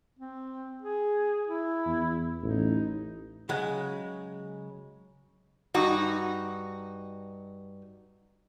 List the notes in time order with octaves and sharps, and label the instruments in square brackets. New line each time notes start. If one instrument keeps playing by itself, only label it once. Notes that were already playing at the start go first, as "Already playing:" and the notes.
[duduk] C4
G#4
E4
[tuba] E2
[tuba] A1 [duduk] D#4
[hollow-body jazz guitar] C#3 F#3 G#3 F#5
[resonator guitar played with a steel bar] G2 D#4 F#4